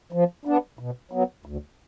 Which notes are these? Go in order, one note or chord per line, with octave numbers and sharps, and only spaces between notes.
F3
B3 D4
B2
F#3 B3
D2